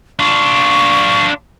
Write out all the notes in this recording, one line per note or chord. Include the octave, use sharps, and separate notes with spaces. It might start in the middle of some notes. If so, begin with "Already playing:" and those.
D4 F4 C#6